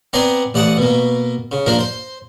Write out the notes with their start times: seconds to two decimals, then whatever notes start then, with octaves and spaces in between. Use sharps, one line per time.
0.13 B3 C4 D5 G#5 A#5 C6
0.54 A1 D5 F#5 A5 D#6
0.77 B2 A#3
1.52 C#3
1.66 F3 A#3 D4 A#4
1.79 C5